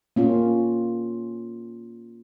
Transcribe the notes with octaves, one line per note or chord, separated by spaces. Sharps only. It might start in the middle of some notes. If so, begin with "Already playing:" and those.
A#3 C#4 F4